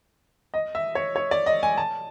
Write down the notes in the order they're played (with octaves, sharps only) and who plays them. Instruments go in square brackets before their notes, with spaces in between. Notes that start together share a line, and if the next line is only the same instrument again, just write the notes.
[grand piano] D#5
E5
C#5
C#5
D5
D#5
G#5
A5